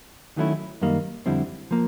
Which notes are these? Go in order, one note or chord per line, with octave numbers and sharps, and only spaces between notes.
D#3 F#3 A3 C#4 E4
F#2 D#3 G3 A#3
F2 D3 G3 C4 E4
F3 A#3